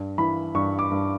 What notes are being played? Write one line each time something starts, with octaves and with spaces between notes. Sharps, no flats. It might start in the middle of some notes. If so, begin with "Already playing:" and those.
Already playing: G2
E3 B5
G2 C#6
D6
G2